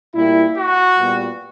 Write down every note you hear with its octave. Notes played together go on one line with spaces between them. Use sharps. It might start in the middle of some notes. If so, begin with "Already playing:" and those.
A#2 G3 A#3 E4
F#4
A#2 G3 B3